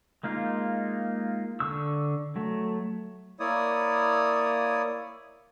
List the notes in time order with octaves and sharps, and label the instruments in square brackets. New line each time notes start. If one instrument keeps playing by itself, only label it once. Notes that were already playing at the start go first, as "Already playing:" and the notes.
[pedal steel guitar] G#3 A#3 D#4 F4
D3 C#6 E6
F#3 A3
[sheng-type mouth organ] A#3 E4 C#5 D5 D#6